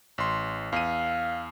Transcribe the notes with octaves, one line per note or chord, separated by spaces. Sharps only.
A1 C6
E2 F5 D#7